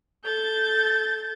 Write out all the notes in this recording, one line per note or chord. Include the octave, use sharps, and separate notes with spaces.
A4 G6 A6